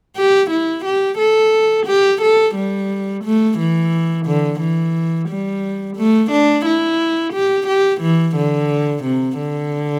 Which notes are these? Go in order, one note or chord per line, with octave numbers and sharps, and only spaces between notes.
G4
E4
G4
A4
G4
A4
G3
A3
E3
D3
E3
G3
A3
D4
E4
G4
G4
E3
D3
C3
D3